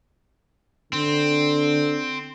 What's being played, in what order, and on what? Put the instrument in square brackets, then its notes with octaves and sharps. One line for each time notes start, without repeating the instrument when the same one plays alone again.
[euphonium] D3 [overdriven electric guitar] C4